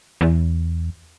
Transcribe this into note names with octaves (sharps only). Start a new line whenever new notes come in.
E2